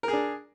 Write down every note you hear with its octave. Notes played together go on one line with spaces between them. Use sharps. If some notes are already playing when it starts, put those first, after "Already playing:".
D4 G#4 A#4